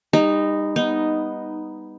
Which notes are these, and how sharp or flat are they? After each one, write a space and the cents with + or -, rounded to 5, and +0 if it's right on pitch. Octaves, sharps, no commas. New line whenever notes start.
G3 +30 D#4 -10
B3 +0 D#4 +0